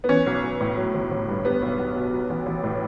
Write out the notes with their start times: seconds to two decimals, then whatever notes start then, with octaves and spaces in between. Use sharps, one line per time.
0.04 B3
0.09 E3 C#4
0.26 B1
0.44 B1
0.60 A2
0.77 F#3
0.94 G1
1.11 G1
1.29 G2
1.45 G3 B3
1.62 B1
1.78 B1
1.95 B2
2.13 F#3
2.30 A1
2.46 A1
2.63 A2